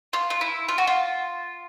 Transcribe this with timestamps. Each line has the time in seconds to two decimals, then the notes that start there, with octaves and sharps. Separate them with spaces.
0.13 F4
0.30 F4
0.41 E4
0.69 F4
0.78 F#4
0.87 F4